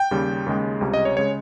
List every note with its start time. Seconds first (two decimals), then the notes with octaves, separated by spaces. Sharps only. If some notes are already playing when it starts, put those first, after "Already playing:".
Already playing: G5
0.11 D#2 C#3 G3
0.46 D#2 C#3 G#3
0.81 C#2 C3 G3
0.94 D#5
1.05 C#5
1.17 C#3 G#3 C#5